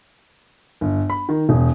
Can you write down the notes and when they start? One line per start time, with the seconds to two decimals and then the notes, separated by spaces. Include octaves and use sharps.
0.81 G1
1.10 B5
1.29 D#3
1.49 E1